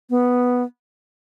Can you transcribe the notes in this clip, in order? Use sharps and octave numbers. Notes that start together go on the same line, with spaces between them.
B3